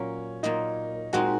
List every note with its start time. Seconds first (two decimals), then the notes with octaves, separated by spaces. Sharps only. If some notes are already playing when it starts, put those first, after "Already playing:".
Already playing: A#2 F#3 A#3 C#4
0.43 A#2 F#3 A#3 D#4
1.13 A#2 G#3 C4 D#4 F#4